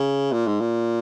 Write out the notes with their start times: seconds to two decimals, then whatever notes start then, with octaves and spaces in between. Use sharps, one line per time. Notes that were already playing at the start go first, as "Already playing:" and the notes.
Already playing: C#3
0.32 A#2
0.46 G#2
0.60 A#2